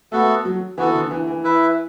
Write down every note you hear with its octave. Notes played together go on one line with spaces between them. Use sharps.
A3 B3 F#4 A4
F#3
E3 B3 F#4 A4
D3
E3
E3
E4 B4 E5